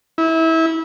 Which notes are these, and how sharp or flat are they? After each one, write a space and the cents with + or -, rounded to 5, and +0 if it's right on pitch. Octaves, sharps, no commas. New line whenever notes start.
E4 -25